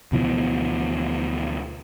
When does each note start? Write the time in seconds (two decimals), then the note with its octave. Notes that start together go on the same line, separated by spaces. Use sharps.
0.12 D2 B2 E3 F3